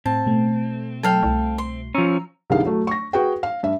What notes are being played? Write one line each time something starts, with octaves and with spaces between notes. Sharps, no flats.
A2 C4 A5
B2 A3
F#3 A4 F5 G5
C2
C6
F3 C#4 A#5 E6
C2 G2 D#3 G3 G#4 F5
F#3 A3
C#6 A#6
F#4 G#4 B4 G5
F5
G2 E5